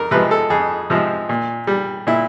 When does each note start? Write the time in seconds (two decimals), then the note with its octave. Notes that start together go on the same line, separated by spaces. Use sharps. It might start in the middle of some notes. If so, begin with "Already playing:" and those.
Already playing: F2 A#4
0.11 C3 F3 G#3 B4
0.31 A4
0.50 F2 G#4
0.90 C3 F3 G#3
1.29 A#2
1.67 G3
2.07 A#2 E4